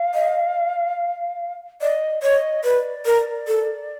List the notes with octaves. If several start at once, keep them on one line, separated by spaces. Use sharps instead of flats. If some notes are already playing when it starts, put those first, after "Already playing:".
Already playing: F5
D#5
D5 D#5
C#5 D#5
B4 D5
A#4
A4